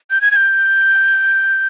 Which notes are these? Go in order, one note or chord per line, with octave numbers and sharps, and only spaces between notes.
G6
G#6
G#6
G6